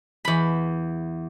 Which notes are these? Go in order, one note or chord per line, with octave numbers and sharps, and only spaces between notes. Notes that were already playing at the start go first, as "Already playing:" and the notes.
E2 B5